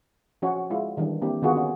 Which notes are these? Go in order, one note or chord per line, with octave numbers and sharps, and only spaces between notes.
F3 C#4 F#4 C#5
G#3 E4 F4
D#3 E3 G3 D4
A#3 C4 D4 E4 G4
D3 D#3 B3 F4 F#4 G#4
C#4